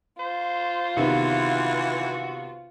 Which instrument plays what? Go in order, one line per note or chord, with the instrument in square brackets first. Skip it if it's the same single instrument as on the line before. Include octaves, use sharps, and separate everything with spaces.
[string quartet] F4 [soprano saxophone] C5
[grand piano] C3 D#3 B3 [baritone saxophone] E3 [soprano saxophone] F#4